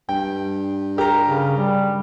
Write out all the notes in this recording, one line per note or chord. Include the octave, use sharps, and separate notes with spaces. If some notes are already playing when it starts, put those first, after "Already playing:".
G2 G5
G4 A#4 A#5
C#3
G3